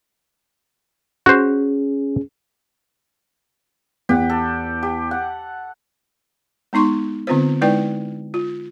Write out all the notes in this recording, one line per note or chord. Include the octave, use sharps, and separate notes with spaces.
C#4 F#4 G#4 C5
E2 G4 F#5
A4
G4
F#5
G#3 B3 D#4 C6 C#6
D3 B3 C4 F4 B4 C5
G#3 D#4 E4 B4 D5 G5
F4